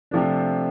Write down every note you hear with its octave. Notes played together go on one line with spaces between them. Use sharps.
C3 F3 A3 D4